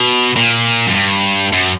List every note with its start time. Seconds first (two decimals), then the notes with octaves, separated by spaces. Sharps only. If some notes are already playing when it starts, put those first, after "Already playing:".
Already playing: B2
0.36 A#2
0.86 F#2
0.94 G2
1.53 F#2